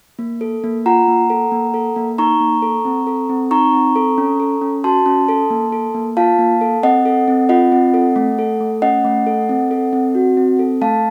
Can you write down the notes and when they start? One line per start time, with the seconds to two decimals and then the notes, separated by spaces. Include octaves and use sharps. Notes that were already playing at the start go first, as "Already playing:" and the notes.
0.19 A#3
0.41 A4
0.64 A#3
0.86 F4 F#5 A#5
1.08 A#3
1.30 A4
1.52 A#3
1.74 A4
1.96 A#3
2.18 D#4 A#5 C#6
2.40 A#3
2.62 A4
2.85 C4
3.07 A4
3.29 C4
3.51 D#4 A#5 C#6
3.73 C4
3.96 A4
4.18 C#4
4.40 A4
4.61 C#4
4.84 F#4 A5 C6
5.06 C#4
5.28 A4
5.50 A#3
5.72 A4
5.95 A#3
6.17 F4 F5 A5
6.38 A#3
6.61 A4
6.83 C4 D#5 F#5
7.05 A4
7.28 C4
7.49 F4 D#5 F#5
7.72 C4
7.94 A4
8.16 A3
8.39 A4
8.60 A3
8.82 C#4 D#5 F#5
9.05 A3
9.27 A4
9.49 C4
9.71 A4
9.93 C4
10.15 F#4
10.37 C4
10.59 A4
10.81 A3 F5 A5